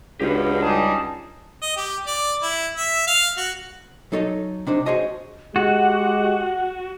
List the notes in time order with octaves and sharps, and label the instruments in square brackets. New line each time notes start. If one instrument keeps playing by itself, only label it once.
[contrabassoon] C#2 [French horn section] D4 F#4 [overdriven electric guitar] G4 B4
[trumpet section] G3 D#4 G#4 [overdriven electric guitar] A5
[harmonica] D#5
G4
D5
E4
E5
F5
F#4
[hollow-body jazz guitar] F#3 D#4 A4 C#5 D#5
C3 D4 D#4 C5
F#4 G#4 C5 C#5 D#5 A5
[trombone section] G#3 G4 [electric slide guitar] F#4 [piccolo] F#5